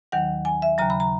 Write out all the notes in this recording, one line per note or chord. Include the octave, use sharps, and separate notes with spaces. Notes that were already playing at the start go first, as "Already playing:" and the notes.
D#2 D#3 F#3 F#5
G#5
E5
D#2 C#3 F#3 A#5
B5
A#5